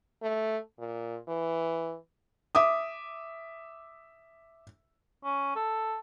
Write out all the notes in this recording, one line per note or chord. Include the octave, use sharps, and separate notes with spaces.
A3
A#2
E3
E5 D6 D#6
C#4
A4